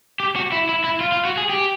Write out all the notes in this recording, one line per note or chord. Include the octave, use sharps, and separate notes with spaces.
G4
F#4
E4
E4
E4
F4
F4
F#4
G#4
G4